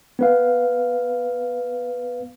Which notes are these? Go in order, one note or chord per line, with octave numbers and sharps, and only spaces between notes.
B3 B4 F5